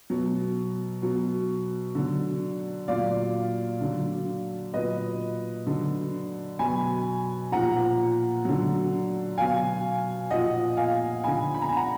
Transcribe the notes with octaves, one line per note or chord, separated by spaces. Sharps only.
B2 F#3
B2 F#3
D3 F#3
A#2 F#3 D5 F5
D3 F#3
A#2 F#3 B4 D#5
D3 F#3
B2 F#3 G#5 B5
A#2 F3 F#5 A#5
D3 F#3
B2 F#3 F5 G#5
A#2 F3 D#5 F#5
F5 G#5
D3 F3 G#5 B5
B5
A#5
G#5
F#5 A#5